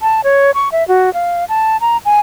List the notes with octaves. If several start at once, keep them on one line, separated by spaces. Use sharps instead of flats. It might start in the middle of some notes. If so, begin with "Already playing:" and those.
A5
C#5
C#6
E5
F#4
F5
A5
A#5
G#5